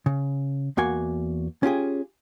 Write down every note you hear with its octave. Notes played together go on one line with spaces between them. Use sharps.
C#3
E2 A#3 F#4 G#5
C#4 F4 G4 G#4